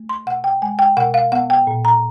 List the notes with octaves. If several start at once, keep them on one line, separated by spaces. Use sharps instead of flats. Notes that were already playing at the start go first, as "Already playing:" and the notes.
Already playing: A3
C6
B2 F#5
G5
G#3 G#5
G5
B2 F#5
F5
B3 F#5
G5
A#2
A#5